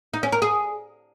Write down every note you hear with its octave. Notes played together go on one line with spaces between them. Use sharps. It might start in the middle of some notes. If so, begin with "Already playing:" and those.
D#4
C#4
A#4
G#4